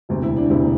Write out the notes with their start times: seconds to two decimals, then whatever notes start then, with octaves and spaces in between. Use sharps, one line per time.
0.09 E1 D2 C3
0.23 E4
0.36 D4
0.50 E1 D2 C3 E4